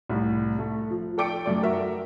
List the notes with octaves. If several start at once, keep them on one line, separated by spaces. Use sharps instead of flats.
C2 A2
A3
F3
A4 D5 G5 D6 C#7 D7
F#2 A3 D5
F#4 A#4 E5 A#5